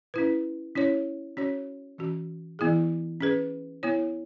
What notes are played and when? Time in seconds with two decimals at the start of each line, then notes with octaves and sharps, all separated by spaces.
0.14 C#4 E4 B4
0.75 C#4 E4 C#5
1.37 C#4 F#4 C#5
1.98 E3 C#4 F#4
2.59 E3 B3 E4 G#4
3.21 C#4 G#4 B4
3.83 B3 E4 C#5